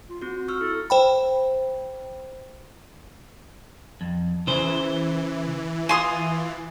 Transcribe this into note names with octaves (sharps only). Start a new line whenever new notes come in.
F4
C4 F#4
C#6 E6 F6
E4 A4
C5 G5 B5
F2
C#3 E3 C5
F4 G#5 C6 D#6